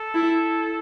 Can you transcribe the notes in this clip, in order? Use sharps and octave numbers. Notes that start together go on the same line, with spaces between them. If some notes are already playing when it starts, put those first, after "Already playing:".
Already playing: A4
E4